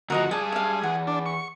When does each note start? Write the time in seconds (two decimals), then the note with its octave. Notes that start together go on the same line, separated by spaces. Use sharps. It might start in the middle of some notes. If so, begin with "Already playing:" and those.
0.10 D2 F3 F#4 A#4 D#5 A#5
0.31 G3 G#4 D5 A5 D#6
0.52 E5 F5
0.83 E2 F#5
1.07 D4
1.26 C#6